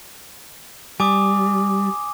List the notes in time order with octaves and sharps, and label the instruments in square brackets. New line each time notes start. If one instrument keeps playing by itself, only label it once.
[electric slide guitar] G3 [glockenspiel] G#5 D6 D#6